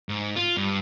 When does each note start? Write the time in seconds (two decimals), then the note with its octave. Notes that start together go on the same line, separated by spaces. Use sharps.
0.09 G#2
0.36 F4
0.57 G2